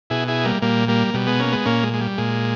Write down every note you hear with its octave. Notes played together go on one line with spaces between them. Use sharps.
B2 E4 G#4
E4 G#4
G3 A#3
A#2 G3 A#3
G3 A#3
B2 G3
G#3 B3
A#3 C#4
G#3 B3
A#2 A#3 C#4
G#3
G#3
G3
A#2 G#3